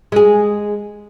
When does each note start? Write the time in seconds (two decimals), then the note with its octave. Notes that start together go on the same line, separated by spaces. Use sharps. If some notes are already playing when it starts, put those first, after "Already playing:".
0.12 G#3 G#4